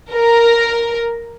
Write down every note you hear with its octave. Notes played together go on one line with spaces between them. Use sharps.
A#4